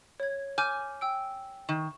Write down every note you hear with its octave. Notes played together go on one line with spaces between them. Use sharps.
C#5 G#6
G#5 D6 F6 G6
G5 E6 D7
D#3